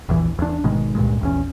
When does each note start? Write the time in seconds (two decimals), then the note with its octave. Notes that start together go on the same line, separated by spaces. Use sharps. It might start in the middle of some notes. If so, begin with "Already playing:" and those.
0.09 A#1 E2 E3
0.39 E2 D4
0.63 G#1 B2 D#3 G#3
0.95 C#2 G2 A#2 G#3
1.21 A#1 E2 C#4